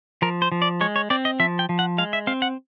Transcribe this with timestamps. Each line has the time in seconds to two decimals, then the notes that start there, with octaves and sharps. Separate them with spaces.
0.22 F3 A#4
0.42 C5
0.52 F3
0.62 D5
0.81 G#3 C#5
0.96 C#5
1.10 C4 D5
1.25 D#5
1.40 F3 E5
1.59 G5
1.69 F3
1.79 F#5
1.98 G#3 F5
2.13 E5
2.27 C4 F5
2.42 F#5